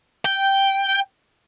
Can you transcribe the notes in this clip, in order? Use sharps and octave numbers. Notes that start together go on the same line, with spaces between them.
G5